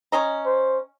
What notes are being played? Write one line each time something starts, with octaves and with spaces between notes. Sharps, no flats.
C#4 D#5 A#5
C5